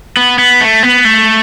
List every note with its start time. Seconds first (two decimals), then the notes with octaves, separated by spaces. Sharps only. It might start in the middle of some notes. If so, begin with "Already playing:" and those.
0.17 B3
0.39 B3
0.61 A3
0.83 B3
1.05 A3